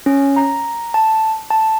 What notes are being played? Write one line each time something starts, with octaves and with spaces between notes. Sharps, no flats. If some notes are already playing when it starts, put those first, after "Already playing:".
C#4
A#5
A5
A5